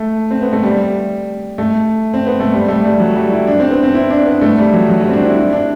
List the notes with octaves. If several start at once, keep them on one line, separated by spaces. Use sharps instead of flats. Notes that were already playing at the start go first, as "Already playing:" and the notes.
Already playing: A3
C4
B3
A3
G3
A3
C4
B3
A3
G3
A3
G3
F#3
G3
E4
D4
C4
B3
C4
E4
D4
B3
A3
G3
F#3
F#3
G3
C4
D4
E4
E4
D4